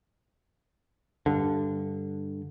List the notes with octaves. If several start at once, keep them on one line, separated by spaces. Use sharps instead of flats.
G2 D3